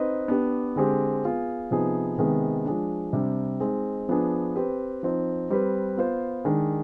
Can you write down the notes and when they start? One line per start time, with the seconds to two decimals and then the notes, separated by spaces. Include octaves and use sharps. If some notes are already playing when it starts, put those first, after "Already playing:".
Already playing: C4 D#4 B4 D#5
0.28 B3 D4 G4
0.76 D3 G#3 C4 G4
1.24 B3 F4 G#4
1.71 C3 F3 B3 D#4 G#4
2.18 C3 D#3 G#3 B3
2.65 F3 G#3 D4
3.13 C3 G3 D4
3.60 G#3 C4 D#4
4.09 F3 B3 D4 G#4
4.56 C4 G4 B4
5.03 F3 C4 D#4
5.50 G3 C4 G4 B4
5.97 B3 F4 C5
6.45 D#3 G#3 D4